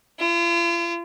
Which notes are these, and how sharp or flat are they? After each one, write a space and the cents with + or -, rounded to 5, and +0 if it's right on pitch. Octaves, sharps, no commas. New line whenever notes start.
F4 -40